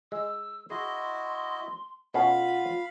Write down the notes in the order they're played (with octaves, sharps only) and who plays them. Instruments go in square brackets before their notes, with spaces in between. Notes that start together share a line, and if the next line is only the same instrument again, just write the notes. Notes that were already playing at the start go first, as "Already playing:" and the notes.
[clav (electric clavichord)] G#3 [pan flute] E6
[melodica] E4 F#4 D#5 [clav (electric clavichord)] G#4 [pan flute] C6
[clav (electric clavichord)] B2 C#4 A4 [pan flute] F4 [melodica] F5 B5 [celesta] F#5